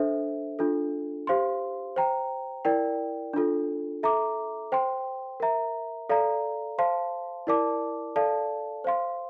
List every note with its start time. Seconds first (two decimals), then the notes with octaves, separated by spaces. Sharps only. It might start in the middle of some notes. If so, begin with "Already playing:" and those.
Already playing: D4 A4 C5 E5
0.59 D4 F4 A4
1.27 G4 C5 F5 C6
1.96 C5 G5 A#5
2.65 E4 A#4 D5 G5
3.34 D4 F4 A4
4.03 A4 E5 A#5 D6
4.72 C5 G5 C6
5.40 A#4 E5 A#5
6.09 A4 D5 F5 A#5
6.79 C5 F5 A5 C6
7.47 E4 A#4 D5 A5 D6
8.16 A4 D5 F5 A5
8.84 C5 F5 C6